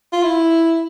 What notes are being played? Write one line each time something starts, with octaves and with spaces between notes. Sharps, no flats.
F4
E4